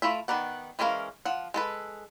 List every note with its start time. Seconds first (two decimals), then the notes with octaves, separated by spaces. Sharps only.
0.02 A3 E4 F4 E5
0.28 D#3 B3 A#4 D5 F#5
0.79 E3 G#3 C#4 A#4 F5
1.25 F3 F#5
1.54 G#3 A4 B4